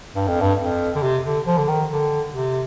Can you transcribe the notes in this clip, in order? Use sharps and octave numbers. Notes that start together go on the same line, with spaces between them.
G2
F2
G2
F2
D3
C3
D3
F3
D3
D#3
D3
C3